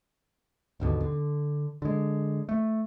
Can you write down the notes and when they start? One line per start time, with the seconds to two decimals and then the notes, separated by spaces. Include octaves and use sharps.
0.80 G#1 D#2 B2 D3
1.01 D3
1.82 D3 G#3
2.49 A3